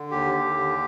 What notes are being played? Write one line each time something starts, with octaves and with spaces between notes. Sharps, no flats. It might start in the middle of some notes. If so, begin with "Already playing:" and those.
Already playing: D3
D#2 G4
D#2
D3